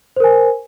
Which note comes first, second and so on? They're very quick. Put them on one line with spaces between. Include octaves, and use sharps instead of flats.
C5 A#4 G#5